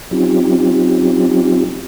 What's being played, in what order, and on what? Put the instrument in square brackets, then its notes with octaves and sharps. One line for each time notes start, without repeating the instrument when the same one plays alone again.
[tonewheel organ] F#3 C4 C#4 D#4 F4 G4